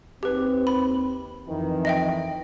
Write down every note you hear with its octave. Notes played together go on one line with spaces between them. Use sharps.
D#2 C4 G4 B4
B5
F2 D#3 E3
D#5 E5 G5